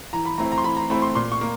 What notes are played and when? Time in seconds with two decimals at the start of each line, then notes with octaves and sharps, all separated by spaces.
0.13 E3 A#5
0.25 B5
0.38 A3 C4 E4 A#5
0.52 A#5
0.58 C6
0.64 E3 B5
0.77 A#5
0.90 A3 C4 E4 B5
1.02 C6
1.15 A#2 C6
1.32 C#6
1.41 A#3